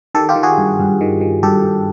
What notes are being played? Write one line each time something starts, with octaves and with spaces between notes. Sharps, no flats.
D#3 G4 A4
F4 G4
D#3
F#4 G#4
G2
G2
D#3
D#3
G2 G4 A4
G2